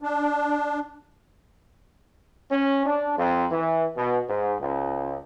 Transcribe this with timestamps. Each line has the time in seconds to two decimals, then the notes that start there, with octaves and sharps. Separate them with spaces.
0.02 D4
2.51 C#4
2.86 D4
3.17 F2
3.51 E3
3.97 B2
4.29 G#2
4.61 C#2